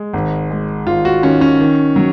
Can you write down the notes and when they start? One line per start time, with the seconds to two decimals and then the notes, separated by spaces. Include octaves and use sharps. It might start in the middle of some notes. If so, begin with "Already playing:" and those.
Already playing: G#3
0.13 G#1
0.50 G#3
0.86 G#1 F4
1.05 F#4
1.23 D#3 C#4
1.41 C#4
1.60 D#3
1.96 F#3